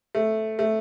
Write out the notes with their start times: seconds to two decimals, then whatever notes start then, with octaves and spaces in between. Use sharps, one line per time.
0.15 A3
0.59 A3